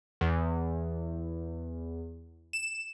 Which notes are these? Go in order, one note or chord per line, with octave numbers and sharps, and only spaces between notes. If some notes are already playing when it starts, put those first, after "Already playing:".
E2
E7